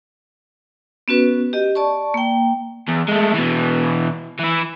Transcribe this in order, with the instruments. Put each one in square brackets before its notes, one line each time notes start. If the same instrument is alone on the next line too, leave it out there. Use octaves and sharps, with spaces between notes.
[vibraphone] B3 C#4 F#4 B4
G4 D#5
D5 A5 C#6
A#3 G5
[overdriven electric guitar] E2
G#3 A3
B2 E3
E3 E4